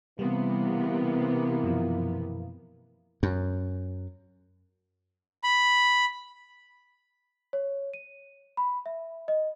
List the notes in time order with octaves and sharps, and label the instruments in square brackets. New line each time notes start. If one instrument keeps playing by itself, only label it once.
[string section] C3 B3 [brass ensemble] E3 A#3 [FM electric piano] G3
[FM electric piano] F#2 B2 F3
[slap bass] F#2
[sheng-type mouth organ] B5
[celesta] C#5
D#7
B5
E5
D#5